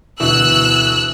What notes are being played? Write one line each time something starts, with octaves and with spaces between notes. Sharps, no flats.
D2 B2 E3 E6 F#6